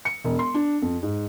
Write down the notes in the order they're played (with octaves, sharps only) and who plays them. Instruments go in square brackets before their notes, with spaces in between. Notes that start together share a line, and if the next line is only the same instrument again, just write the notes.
[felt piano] C#7
E1
C6
D4
F2
G#2